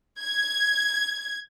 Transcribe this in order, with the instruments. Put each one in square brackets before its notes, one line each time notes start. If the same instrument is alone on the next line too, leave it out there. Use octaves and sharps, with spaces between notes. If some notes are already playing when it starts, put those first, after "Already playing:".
[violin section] G#6